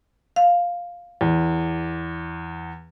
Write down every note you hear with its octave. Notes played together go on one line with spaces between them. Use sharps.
F5
E2